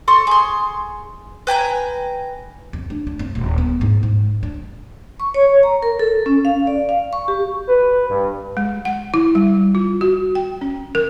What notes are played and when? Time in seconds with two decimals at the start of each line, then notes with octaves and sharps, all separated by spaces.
0.08 A4 C6 C#6
0.27 G#4 C6
1.47 B4 G5 G#5 A#5
2.73 F2
2.90 D4
3.07 D4
3.19 F2
3.35 D#1
3.58 B3
3.81 G#2
4.03 G#2
4.43 D4
5.20 C#6
5.34 C#5
5.63 A#5
5.83 A#4
5.99 A4
6.26 C#4
6.45 F5
6.67 D5
6.89 F5
7.13 C#6
7.28 G4
7.68 B4
8.09 G2
8.57 G#3
8.85 F#5
9.14 E4
9.35 G3
9.75 F4
10.01 F#4
10.35 G5
10.61 C#4
10.95 A#4